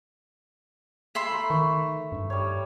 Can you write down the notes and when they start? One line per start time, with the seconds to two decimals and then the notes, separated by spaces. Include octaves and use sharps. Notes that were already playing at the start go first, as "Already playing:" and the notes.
1.15 E5 B5 C6
1.28 A3 A#5
1.50 D#3 C#6
2.12 G2
2.30 G3 C#5